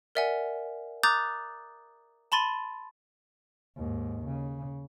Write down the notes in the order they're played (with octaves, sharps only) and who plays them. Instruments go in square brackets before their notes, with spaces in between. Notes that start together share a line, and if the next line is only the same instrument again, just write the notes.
[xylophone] A#4 D5 E5 F#5 G#5
A#5 D6 D#6 F#6 G6 A6
A5 B5 C6 A6 D#7
[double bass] D#2 G#2
C#3